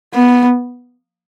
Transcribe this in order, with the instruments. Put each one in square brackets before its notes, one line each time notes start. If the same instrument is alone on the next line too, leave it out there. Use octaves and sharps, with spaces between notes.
[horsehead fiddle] B3